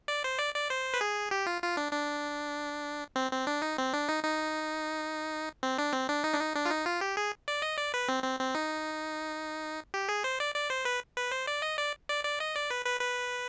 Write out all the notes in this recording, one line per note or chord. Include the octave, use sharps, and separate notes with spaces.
D5
C5
D5
D5
C5
B4
G#4
G4
F4
F4
D4
D4
C4
C4
D4
D#4
C4
D4
D#4
D#4
C4
D4
C4
D4
D#4
D4
D#4
D4
F4
D#4
F4
G4
G#4
D5
D#5
D5
B4
C4
C4
C4
D#4
G4
G#4
C5
D5
D5
C5
B4
B4
C5
D5
D#5
D5
D5
D5
D#5
D5
B4
B4
B4